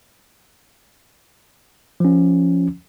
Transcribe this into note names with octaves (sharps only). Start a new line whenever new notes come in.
F3 C#4